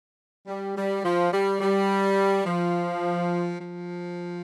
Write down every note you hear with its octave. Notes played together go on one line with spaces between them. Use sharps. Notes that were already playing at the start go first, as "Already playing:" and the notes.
G3
G3
F3
G3
G3
F3
F3